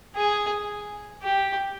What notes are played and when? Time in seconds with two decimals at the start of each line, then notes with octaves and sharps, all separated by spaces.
0.16 G#4
1.23 G4